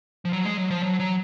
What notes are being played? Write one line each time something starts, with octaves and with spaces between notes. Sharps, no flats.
F3
F#3
G#3
F#3
F3
F#3
F#3